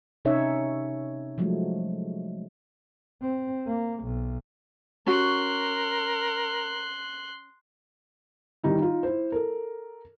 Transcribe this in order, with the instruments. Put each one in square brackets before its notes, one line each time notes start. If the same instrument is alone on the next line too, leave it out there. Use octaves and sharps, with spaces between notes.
[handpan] C3 C#4 D#4 C#5 E5
F3 F#3 G#3 A3
[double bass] C4
A#3
B1
[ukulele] C#4 F#4 [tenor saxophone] A#4 [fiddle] C6 F#6
[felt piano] D#3 G3 D#4 E4
D#4 F4
E4 C5
A4 A#4